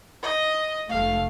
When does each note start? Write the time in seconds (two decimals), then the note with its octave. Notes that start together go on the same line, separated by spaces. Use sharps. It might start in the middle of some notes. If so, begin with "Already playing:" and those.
0.22 D#5
0.89 F1 A3 F5